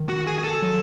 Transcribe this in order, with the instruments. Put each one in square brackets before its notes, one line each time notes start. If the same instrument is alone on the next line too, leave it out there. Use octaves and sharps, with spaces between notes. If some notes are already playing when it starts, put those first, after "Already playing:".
Already playing: [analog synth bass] D#3
[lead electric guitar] F#4
G#4
G#4
A4
[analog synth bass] F#3